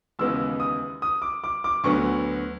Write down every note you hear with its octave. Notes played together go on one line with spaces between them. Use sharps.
D#2 C#3 E3 G#3 B3 E6
D#6
D#6
D6
D6
D6
D2 D3 F#3 B3 C#6